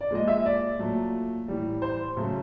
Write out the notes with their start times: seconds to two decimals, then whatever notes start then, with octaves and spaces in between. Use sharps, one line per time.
0.01 D5
0.11 A#2 F3 G#3 D#5
0.28 E5
0.46 D5
0.79 A#2 F#3 A3
1.48 A2 E3 G3
1.82 C5
2.17 C#3 F#3 A3